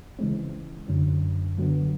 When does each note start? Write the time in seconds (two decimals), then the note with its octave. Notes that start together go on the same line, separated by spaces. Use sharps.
0.19 C#3 E3 G#3 C4
0.88 F#2 D3 F#3
1.58 D3 F#3 B3